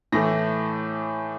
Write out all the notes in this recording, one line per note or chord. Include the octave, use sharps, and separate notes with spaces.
A2 E3 A3 A#6